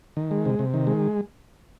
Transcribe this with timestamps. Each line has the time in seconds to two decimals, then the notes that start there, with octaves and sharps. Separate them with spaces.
0.17 D#3
0.31 G#3
0.45 C3
0.59 C3
0.74 D#3
0.87 G#3